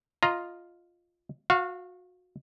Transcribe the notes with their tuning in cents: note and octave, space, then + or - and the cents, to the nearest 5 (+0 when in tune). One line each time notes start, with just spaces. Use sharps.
F4 +0 D#5 +0 A#5 +10
F#4 -30 F5 +0